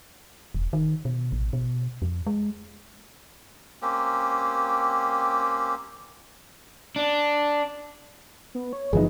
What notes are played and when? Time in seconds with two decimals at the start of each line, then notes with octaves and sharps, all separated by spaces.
0.54 E1
0.73 D#3
1.05 B2
1.32 A1
1.53 B2
2.02 F2
2.27 G#3
3.82 A#3 C4 C#4 G4
6.96 D4
8.55 B3
8.73 C#5
8.93 F#1 E3 F3 G#3 B3 D#4 G#4